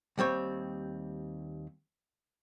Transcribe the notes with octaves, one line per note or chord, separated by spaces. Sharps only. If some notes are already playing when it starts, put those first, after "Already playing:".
D#2 G3 C4 C#5